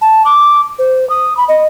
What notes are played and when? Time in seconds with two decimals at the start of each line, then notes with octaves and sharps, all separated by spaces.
0.02 A5
0.25 D6
0.79 C5
1.10 D#6
1.37 B5
1.49 D#5